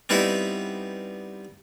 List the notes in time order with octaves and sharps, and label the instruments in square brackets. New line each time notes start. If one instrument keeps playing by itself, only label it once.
[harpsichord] G3 B3 C4 D#4 E4